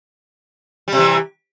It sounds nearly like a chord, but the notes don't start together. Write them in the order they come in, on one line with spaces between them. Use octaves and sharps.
G3 C3 E3